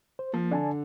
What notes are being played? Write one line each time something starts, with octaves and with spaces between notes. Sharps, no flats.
C5
F3 A#3
D3 D5 G#5 A5